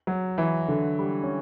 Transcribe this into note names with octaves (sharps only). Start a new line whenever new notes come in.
F#3
E3
D3
G3
C#4